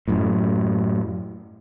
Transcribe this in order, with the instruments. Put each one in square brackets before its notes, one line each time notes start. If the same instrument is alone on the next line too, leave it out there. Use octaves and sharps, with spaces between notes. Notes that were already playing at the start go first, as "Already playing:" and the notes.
[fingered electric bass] F#2 A2